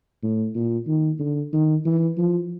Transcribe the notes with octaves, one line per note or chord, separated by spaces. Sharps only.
A2
A#2
D#3
D3
D#3
E3
F3